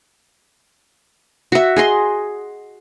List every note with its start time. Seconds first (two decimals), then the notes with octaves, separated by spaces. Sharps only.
1.52 F#4 E5
1.76 G#4 D#5 C6